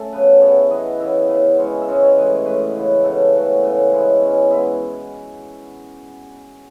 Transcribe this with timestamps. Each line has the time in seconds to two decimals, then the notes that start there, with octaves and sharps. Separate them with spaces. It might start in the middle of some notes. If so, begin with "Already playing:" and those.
Already playing: A3 C#4 A4
0.12 C#3 F#3 B3 B4
0.41 E3 B3 C#5
0.70 E3 B3 D#5
1.00 C#3 E3 B3 E5
1.29 C#3 E3 B3
1.58 E3 G#3 C#4 C#5
1.82 E5
1.88 E3 G#3 C#4 D#5
2.03 C#5
2.17 A2 E3 G#3 B4
2.46 A2 E3 G#3 B4
2.76 C#3 E3 B3
3.04 C#3 E3 B3 A4
3.33 C#3 E3 A3 F#4
3.63 C#3 E3 A3
3.92 B2 G#3 C#4 E4
4.22 B2 G#3 C#4
4.50 E3 G#3 B3 E4